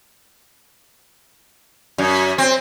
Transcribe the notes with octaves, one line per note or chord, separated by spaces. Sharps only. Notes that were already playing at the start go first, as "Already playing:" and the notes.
F#2
C4